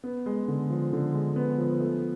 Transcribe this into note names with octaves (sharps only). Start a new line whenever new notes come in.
B3
G#3
D3
F3
D3
G#3
B3
F3
A3